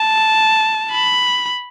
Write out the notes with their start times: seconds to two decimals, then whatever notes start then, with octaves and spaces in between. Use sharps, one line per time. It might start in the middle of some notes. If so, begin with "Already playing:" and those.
Already playing: A5
0.92 B5